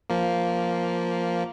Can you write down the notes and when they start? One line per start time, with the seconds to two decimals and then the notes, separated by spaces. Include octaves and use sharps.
0.10 F3 A#3